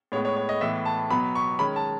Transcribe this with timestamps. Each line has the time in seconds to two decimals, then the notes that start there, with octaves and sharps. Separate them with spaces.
0.12 A2 G#3 B3 C#5
0.25 C#5
0.37 C#5
0.49 D#5
0.61 A2 E3 B3 E5
0.85 A5
1.10 B2 F#3 B3 B5
1.35 C#6
1.59 D#3 G#3 C#4 B5
1.76 A5